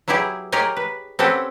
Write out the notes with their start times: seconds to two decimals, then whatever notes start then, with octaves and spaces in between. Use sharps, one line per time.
0.08 F#3 B3 E4 G4 G#4
0.52 G4 G#4 A#4 C#5 D#5 G#5
0.77 B4
1.19 C4 C#4 G4 A4 B4 F#5